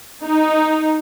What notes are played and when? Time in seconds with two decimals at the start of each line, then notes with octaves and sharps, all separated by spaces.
0.24 D#4